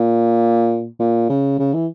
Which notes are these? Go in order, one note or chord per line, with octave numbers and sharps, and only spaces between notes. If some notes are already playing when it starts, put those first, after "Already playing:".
Already playing: A#2
A#2
C#3
C#3
E3